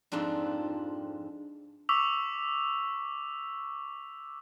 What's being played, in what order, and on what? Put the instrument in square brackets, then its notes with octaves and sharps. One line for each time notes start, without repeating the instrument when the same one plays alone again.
[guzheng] F2 G#2 F3 C4 D4
[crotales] C#6 D6 E6 B6 F7